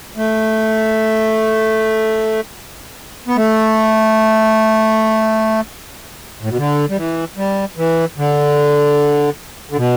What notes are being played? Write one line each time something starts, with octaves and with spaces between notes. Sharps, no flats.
A3
B3
A3
A2
B2
D3
G3
E3
G3
E3
D3
D3
B2